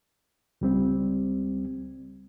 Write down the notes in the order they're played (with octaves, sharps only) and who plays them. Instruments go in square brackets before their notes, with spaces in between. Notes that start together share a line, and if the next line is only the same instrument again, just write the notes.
[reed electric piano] C#2 G3 C4